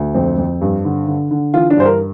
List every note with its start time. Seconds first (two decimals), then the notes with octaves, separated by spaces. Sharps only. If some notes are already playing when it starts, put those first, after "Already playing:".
Already playing: D2
0.15 F2 C4
0.38 F2
0.61 G2
0.85 D3
1.07 D3
1.31 D3
1.54 E3 F4
1.70 D4
1.78 G2 C5
1.85 A#4